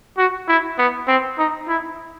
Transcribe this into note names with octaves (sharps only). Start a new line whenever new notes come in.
F#4
E4
B3
C4
D#4
E4